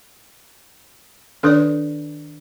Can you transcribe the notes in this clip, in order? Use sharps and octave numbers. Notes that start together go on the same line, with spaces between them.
D#3 D4 A4 B4 D5 D#6